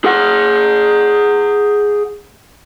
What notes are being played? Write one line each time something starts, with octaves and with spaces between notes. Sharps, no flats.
G#4 F#5